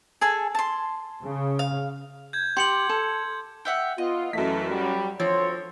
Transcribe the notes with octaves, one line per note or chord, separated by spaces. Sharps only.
G#4 A4 G#5
A5 C6
C#3
F5
G6 G#6
G4 C6 C#7 F#7
A4
G4 E5 F#5
B3 F4 D#5
F#2 E3 A3 B6
F#3 G3
D2 F3 C4 C#5